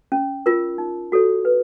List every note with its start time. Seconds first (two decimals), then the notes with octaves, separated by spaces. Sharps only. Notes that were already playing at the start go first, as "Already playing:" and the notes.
0.12 C#4
0.46 F4 A#4
0.78 D#4
1.12 F#4 A4 C#5
1.45 B4